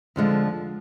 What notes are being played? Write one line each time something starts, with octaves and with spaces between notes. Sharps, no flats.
F2 D3 F3 G#3